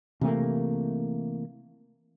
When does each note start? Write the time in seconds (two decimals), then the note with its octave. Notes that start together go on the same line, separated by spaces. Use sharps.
0.21 C3 E3 A3 A#3